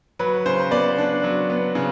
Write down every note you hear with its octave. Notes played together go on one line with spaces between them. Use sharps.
F#3 B4
C#3 C5
B3 D5
D4
F#3
B3
C#3